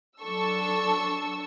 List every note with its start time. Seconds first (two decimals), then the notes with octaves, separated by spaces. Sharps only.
0.22 F#3 D4 A4 A5 C#6 E6